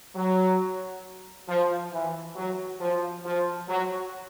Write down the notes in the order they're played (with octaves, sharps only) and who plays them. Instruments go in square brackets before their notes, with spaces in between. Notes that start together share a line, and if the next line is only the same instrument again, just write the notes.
[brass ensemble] F#3
F3
E3
F#3
F3
F3
F#3